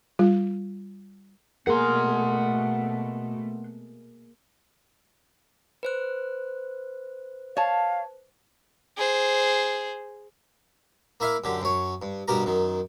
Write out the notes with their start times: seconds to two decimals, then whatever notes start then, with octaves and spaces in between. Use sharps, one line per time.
0.19 G3 F4
1.67 B2 A3 A#3 G#4 A#4 F#5 C6
5.83 B4 C5 F#6
7.57 C#5 F5 A5
8.97 G#4 C5
11.20 A#3 E4 E5 F5
11.44 F#2 D3 G4
11.62 F#2 C#5
12.02 G2
12.28 G2 B2 G4 A#4 A#5
12.46 F#2 D#3